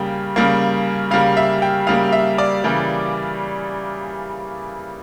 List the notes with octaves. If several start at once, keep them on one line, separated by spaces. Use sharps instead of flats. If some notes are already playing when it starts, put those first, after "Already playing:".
Already playing: C#3 G3 A#3 G5
C#3 G3 A#3
C#3 G3 A#3 F5
E5
G5
C#3 G3 A#3 F5
E5
D5
C#3 E3 G3 A#3